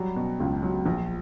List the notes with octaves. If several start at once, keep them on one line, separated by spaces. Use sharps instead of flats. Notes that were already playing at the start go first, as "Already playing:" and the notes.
Already playing: F#3 G3
B2
C#2
F#3
A#1